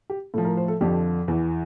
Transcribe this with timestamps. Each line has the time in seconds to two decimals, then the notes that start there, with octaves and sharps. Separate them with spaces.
0.10 G4
0.34 A2 A4
0.38 F3
0.45 A#4
0.57 C5
0.68 A4
0.81 F2 D3 F3 G4
1.28 E2 E3